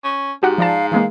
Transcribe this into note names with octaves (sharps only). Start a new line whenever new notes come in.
C#4
G#2 F#4 G4 F#5
F3 D5 F5 A5
E3 G#3 A#3 F5